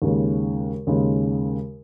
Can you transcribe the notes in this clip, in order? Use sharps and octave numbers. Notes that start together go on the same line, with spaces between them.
D#2 C#3 G#3
D#2 C#3 G#3